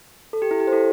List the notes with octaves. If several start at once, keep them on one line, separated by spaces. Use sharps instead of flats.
A4
G4
E4
G4
C5
E4 A4